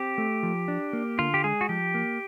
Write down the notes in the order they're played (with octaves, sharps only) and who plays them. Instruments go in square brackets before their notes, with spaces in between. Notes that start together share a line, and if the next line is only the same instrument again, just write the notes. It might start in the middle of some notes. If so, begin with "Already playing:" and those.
Already playing: [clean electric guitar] C4 [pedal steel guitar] G4
[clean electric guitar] A3
F3
D4
A#3
[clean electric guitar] D3 [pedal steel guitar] F4
[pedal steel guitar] G4
[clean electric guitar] G#3 [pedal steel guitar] G#4
[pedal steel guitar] F#4
[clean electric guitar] F3 [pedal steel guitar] G4
[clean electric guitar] A#3